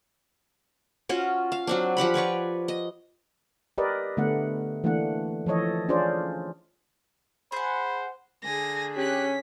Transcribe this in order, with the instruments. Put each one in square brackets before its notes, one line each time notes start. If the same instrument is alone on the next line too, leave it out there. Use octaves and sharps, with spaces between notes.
[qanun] C#4 F4 F#4
F5
F#3 C4 D4
F3 G4 F#5 B5
B4 C#5 D5 C#6
D#5
[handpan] G4 A#4 B4 D5 D#5
D3 A3 B3 F#5
E3 A3 A#3 D4 F#5
E3 F3 A4 C#5 D#5
C#4 D4 F4 G#4 C5 D5
[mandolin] G#4 F#5 [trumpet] C5 [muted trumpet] B5
[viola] D3 G#4 [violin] G#5 A#6
[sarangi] C#4 [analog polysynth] G4 F#6 [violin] B6